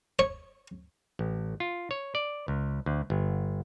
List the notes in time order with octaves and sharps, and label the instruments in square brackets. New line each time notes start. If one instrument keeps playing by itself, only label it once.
[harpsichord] C#5
[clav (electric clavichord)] A1
F4
C#5
D5
C#2
D2
G1